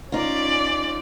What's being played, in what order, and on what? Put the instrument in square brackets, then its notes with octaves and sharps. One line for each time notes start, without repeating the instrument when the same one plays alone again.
[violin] C#4 D5 [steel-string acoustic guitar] D#4 F4